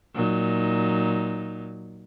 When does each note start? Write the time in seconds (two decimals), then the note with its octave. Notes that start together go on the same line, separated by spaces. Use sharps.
0.15 A#2 F#3 D#4